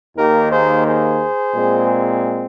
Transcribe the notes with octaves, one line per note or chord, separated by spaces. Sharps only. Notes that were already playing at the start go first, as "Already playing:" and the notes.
D#2 D#3 A#3 G4 A#4
G#4 C5
G#4 C5
A#2 G#3 C4